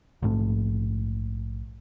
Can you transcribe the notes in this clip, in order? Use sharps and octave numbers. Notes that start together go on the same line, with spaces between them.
A#1 G#2 A3